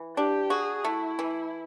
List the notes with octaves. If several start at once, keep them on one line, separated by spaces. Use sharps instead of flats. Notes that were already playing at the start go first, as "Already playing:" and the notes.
Already playing: E3
D4 G4
F#4 G#4
A3 E4
E3